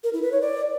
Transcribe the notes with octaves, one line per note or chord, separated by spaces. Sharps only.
A#4
E4
B4
C#5
D5